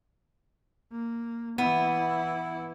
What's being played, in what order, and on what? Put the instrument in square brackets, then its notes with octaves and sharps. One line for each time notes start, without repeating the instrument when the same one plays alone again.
[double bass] A#3
[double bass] E3 E4 [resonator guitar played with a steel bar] B3